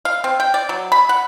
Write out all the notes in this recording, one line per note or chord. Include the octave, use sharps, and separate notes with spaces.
F5
C4
G5
D5
F#3
B5
F#5